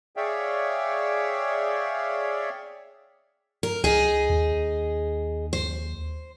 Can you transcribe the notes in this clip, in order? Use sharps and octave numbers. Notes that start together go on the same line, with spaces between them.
G#4 C#5 D5 E5 F5 G5
A#4
C#2 D#4 G#4
D#2
C5